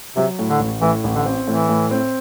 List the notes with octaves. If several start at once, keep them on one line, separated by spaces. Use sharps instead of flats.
C3 F#3
A2
D3
A1
A2 E3
A1
D3
C4
A2 E3
A2
C4